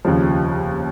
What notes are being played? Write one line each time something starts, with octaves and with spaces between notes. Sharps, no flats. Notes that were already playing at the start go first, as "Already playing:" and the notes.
F1 D#2 C#3 F3